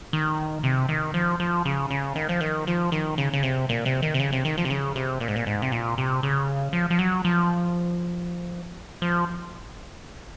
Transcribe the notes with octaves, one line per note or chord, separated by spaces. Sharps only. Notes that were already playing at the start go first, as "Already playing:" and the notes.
D#3
C3
D#3
F3
F3
C#3
C#3
D#3
F3
D#3
F3
D#3
C#3
C#3
C3
A#2
C3
D#3
C3
C#3
C3
D#3
F3
C3
C#3
C3
A#2
G#2
A#2
G#2
C3
A#2
C3
C#3
F3
F3
F#3
F3
F3